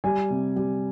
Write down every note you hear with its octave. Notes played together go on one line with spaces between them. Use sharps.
G3 G#5
C3
G3